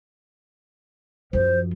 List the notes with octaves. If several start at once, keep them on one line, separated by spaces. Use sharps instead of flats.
F#2 F3 C5